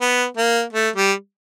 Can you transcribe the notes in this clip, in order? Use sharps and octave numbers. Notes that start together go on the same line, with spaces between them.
B3
A#3
A3
G3